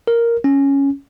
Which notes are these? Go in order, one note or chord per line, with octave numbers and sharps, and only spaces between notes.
A#4
C#4